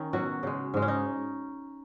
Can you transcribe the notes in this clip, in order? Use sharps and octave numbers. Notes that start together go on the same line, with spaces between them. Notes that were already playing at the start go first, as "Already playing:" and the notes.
Already playing: D#3 C#4 D#4
B2 F#3 F#4
C#3 G#3
G#2 G#3
C#4
D#4